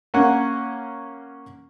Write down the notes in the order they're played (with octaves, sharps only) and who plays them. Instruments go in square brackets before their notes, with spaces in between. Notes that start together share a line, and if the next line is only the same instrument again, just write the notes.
[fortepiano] A#3 C#4 F#5